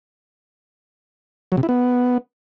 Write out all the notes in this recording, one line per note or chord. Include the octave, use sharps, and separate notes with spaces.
F#3
C3
E4
B3